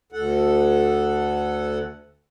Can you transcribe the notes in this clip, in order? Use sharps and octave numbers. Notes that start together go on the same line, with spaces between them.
D2 A4 F#5